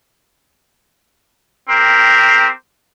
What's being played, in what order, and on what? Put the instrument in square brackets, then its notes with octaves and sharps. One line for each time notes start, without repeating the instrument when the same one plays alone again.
[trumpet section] C4 G4 A#4